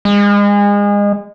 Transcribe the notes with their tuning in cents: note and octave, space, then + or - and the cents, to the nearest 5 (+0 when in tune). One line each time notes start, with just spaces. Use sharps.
G#3 -30